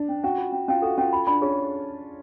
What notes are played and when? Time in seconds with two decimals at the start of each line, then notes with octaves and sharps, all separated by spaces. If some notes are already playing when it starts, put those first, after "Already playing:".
Already playing: D4
0.09 C#4
0.23 C#4 F#4
0.38 F4
0.52 C#4
0.68 C#4 F4
0.82 F#4 A4
0.98 C#4 F4
1.13 F4 B5
1.27 D4 B5
1.42 C#4 G#4